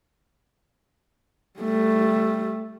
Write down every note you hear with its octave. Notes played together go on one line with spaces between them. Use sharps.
G3 A3